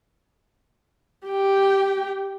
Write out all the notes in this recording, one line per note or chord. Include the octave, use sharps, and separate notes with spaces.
G4 G5